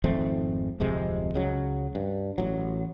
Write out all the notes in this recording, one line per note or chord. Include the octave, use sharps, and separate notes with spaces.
G#1 F2 A3 C4
D1 F2 C3 G#3
C#2 C#3 F#3
G2
A1 F#3